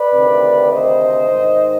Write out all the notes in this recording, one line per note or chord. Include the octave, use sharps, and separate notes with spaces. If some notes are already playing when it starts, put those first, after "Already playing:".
Already playing: B4 D5
D2 C3 D#3
C5 D#5
G#2 D#3